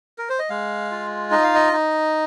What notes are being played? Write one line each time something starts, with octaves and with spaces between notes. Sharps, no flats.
A#4
C5
D#5
G#3 F5
F4
D#4 D#5
F5
D#5
D#4